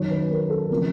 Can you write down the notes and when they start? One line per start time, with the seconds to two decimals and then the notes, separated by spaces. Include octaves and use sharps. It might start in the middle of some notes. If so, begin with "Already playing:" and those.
Already playing: F#2 D#3 F#3 C#5
0.10 B4
0.30 A#4
0.50 A4
0.70 C#3 F3 A3 C4 A#4